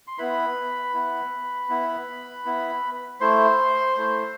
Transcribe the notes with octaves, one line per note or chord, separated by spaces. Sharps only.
C6
B3 E4 B4 B5
B3 E4
B3 E4
B3 E4
A3 E4 C5 C6
A3 E4